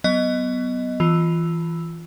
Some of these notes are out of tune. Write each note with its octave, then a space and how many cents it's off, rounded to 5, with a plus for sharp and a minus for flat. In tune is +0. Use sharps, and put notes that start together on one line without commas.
F#3 +25 B3 +15 D#5 +0
E3 +0 F4 +0